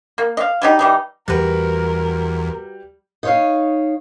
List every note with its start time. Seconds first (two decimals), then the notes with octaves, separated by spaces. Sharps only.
0.18 A#3
0.37 D#5 F5
0.62 F#3 G3 D#4
0.79 E3 G3 D#4
1.28 E2 G3 F#4 A#4 B4
3.23 D#4 C#5 F5